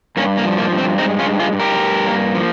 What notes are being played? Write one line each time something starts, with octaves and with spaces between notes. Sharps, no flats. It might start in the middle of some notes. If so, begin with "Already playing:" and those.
G2 A#3 C#4
A#3
F3
A#3
G2
C4
G#3 C4 D#4
C#4 F4
G2
F4 G#4
G2
G4 A#4
G2
A#3
F3